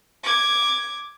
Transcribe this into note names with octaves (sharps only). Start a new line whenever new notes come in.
D6 G#6